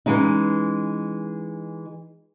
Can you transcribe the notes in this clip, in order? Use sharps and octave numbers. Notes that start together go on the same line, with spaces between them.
E3 G#3 C#4 D#4